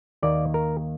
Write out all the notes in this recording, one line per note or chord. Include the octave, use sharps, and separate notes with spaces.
D#2 D#3 A#3 D5
A#4